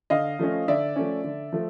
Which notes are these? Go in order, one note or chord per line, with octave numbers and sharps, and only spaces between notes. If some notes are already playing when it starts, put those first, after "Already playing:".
D3 D#5 F5
F3 A3 C#4
D3 D5 E5
F3 A3 C#4
D3
F3 A3